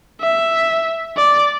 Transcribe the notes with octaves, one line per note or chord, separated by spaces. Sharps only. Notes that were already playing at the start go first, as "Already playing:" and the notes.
E5
D5